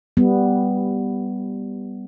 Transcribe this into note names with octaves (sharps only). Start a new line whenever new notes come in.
G3 B3